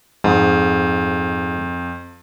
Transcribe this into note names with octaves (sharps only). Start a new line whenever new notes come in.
F2 G#2